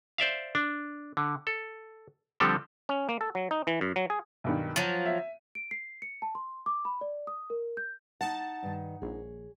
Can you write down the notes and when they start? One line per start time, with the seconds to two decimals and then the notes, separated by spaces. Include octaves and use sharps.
0.18 C5 D5 E5 F5
0.55 D4
1.17 D3
1.47 A4
2.40 D3 F3 G3 C4 G4 A4
2.89 C#4
3.09 A#3
3.21 A4
3.35 F#3
3.51 D#4
3.67 E3
3.81 F#2
3.96 F#3
4.10 G#4
4.44 B1 G2 D#3
4.76 F3 F#3 D#7
5.06 E5
5.55 D7
5.71 C7
6.02 C#7
6.22 A5
6.35 C6
6.66 D6
6.85 B5
7.01 D5
7.27 D#6
7.50 A#4
7.77 G6
8.21 D#4 F#5 A5
8.63 G2 D#3
9.02 A#1 G#4 C#5